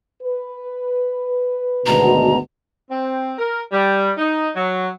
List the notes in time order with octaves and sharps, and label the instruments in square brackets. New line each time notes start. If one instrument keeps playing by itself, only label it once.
[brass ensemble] B4
[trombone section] G#1 D2 B2 [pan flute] A#5
[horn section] C4
A#4
G3
D#4
F#3